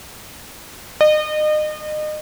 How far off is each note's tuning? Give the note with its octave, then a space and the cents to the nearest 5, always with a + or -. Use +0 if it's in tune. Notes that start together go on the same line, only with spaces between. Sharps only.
D#5 -35